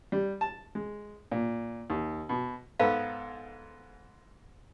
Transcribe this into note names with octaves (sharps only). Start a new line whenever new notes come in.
G3
A5
G#3
A#2
D#2
B2
G#2 B3 A4 F5